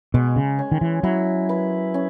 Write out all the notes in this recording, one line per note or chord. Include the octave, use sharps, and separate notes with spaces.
B2 G#3
C#3
C#4
D#3
E3
F#3 E4
B4
C#4